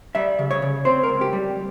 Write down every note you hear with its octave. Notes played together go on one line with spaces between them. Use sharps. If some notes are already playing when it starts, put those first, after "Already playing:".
G3 E5
C#3
C#5
C#3
C4 C5
A#4
C#2
G4
G3